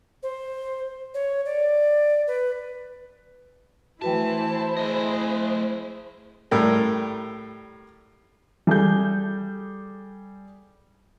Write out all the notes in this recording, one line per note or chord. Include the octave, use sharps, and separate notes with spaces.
C5
C#5
D5
B4
E3 A3 E4 F#4 B4 C5 G5 A5
A3 G#4 D#5
A2 G3 G4 A#4
G3 G#4 A4 G6